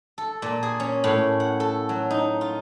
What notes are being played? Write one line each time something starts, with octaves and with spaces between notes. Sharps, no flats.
A4
A#2
G#4
C#4
A2
F#5
A4
F#3
D#4
F4